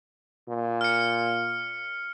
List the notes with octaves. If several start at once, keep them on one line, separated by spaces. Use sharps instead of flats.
A#2
F6 C#7